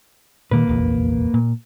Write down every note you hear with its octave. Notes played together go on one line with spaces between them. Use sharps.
A#2 D#3 A#3 B4
F1 A#1 E2
A#2